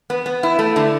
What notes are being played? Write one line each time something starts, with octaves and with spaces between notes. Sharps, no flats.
B3
B3
E4
A3
D3